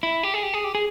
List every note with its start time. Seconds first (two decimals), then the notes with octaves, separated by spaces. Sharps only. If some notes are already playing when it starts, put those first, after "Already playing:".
0.03 E4
0.23 G4
0.34 G#4
0.43 G4
0.54 G#4
0.64 G4
0.75 G#4